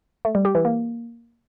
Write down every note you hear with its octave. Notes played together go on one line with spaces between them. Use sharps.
A3
G3
G4
E3
A#3